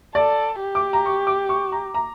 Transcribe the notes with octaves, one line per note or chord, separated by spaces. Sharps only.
A4 D5
G4
D6
A#5
C#6
D6
C#6
A#5
A#5